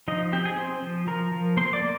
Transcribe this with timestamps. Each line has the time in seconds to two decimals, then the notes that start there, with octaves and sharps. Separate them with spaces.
0.08 F3 D#4 D#5
0.33 C4 G4 G5
0.45 G#4 G#5
0.57 C4 C5 C6
0.82 F3
1.07 F3 A#4 A#5
1.32 F3
1.57 A#3 C5 C6
1.73 D5 D6
1.82 A#3